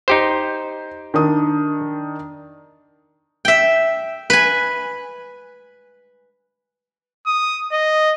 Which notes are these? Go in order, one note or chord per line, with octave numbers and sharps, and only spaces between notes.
D#4 G4 C5 G6
D#3 D4 D#6
E5 G5
B4 G#5
D#6
D#5